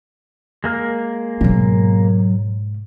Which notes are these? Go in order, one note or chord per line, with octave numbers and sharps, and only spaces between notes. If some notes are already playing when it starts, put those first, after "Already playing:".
G#3 A#3 F6
G#2 B2 F#3